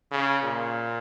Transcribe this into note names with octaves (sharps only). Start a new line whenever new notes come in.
C#3
A#2